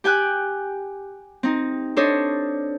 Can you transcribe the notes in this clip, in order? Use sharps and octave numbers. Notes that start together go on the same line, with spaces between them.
G4 G5 G#5 F#6
C4 D#4
D4 A4 C5 C#5 D#5